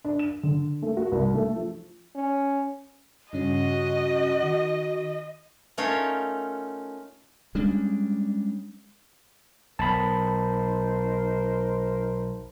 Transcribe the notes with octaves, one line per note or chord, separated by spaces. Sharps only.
D4
E7
D3
A3
F#4
C2
A3
F3
C#4
G2 C#3 C#4 F#4 D#5
D#3
A3 C#4 D#4 F4 A#4 C#5
G3 G#3 C#4 D4
B1 D#4 A#4 C5 A5 B5